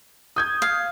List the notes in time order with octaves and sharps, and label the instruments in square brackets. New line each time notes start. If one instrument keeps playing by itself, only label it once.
[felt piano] D#6 G6 G#6
[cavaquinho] F5